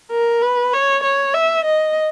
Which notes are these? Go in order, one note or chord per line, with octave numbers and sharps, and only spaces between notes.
A#4
B4
C#5
C#5
E5
D#5